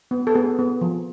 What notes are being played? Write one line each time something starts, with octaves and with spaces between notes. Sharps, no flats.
B3
A4
B3 G#4
B3
F3